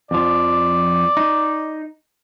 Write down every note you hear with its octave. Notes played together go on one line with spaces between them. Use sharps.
F2 F3 D5
D#4